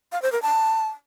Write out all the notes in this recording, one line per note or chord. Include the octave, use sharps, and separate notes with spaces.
F5
C5
A#4
A5